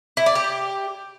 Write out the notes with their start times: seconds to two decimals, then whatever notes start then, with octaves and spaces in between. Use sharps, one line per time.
0.17 E4
0.26 D5
0.35 G4